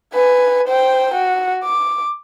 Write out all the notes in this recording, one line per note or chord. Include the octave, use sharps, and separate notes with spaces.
B4 G#5
C5 G5
F#4
D6